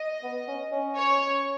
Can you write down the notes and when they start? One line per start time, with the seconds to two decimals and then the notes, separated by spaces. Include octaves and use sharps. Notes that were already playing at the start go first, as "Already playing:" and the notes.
Already playing: D#5
0.23 B3
0.48 C#4
0.72 C#4
0.96 C#5